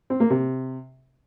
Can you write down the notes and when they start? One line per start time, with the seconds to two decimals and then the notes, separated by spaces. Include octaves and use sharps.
0.10 C4
0.20 A#3
0.30 C3